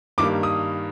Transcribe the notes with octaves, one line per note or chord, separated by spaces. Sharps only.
G2 D#3 G3 A#3 D#4 D6
D#6